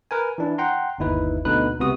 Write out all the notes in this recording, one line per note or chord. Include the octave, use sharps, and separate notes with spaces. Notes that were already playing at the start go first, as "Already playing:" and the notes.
A#4 B4 G#5
E3 D4 E4
F#5 G5 A#5 C6
G1 D#2 D#4 E4 B4
D2 B2 D3 D#4 B4 F#6
C#2 C3 B3 F#4 D#6